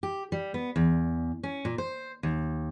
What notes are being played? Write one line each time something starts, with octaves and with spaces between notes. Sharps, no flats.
G4
G3
B3
E2
C#4
A#2
C5
D#2